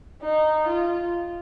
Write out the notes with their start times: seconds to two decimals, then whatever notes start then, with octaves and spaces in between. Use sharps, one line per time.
0.22 D#4
0.68 F4